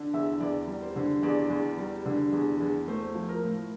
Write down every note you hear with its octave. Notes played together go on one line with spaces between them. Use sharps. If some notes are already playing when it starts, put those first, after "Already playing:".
Already playing: D3
E2 E5
E2 D5
G3
C5
D3
E2 D5
E2
G3
D3
E2
E2
A3 C5
F3
A#4
A2